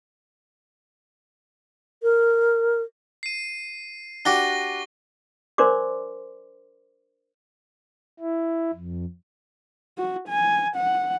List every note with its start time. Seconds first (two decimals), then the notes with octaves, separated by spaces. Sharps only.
2.03 A#4
3.23 C7 D#7
4.25 D4 F#4 G4 C#6 A#6 G7
5.58 D4 A#4 C5 D5 C6 D6
8.20 E4
8.73 F2
9.98 F#4
10.28 G#5
10.76 F#5